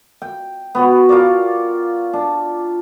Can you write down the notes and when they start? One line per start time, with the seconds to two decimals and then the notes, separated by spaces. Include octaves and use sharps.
0.22 G5
0.75 B3 F#4 C#5
1.09 F4 A#4 C#5 D5
2.13 D4